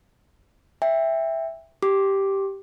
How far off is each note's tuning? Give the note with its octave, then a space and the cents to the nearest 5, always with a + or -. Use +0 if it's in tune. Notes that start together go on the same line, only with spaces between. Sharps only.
E5 +0 G5 +25
G4 -5 D6 +0